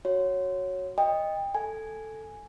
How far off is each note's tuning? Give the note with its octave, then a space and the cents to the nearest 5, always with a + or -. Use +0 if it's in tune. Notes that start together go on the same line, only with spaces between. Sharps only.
F#4 +0 C#5 -5
D#5 +0 G5 +25
A4 +0 G#5 +0